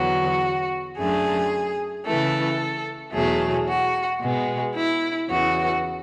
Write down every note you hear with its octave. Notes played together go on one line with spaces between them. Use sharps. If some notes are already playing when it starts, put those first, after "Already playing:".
Already playing: E2 D3 F#3 B3 F#4
F#2 D3 A3 G#4
C#3 E3 A3 A4
E2 B2 F#3 A3 G#4
F#4
B2 G#3 B3
E4
E2 C#3 E3 F#4